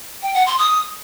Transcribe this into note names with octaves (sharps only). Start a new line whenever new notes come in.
G5
F#5
C6
D#6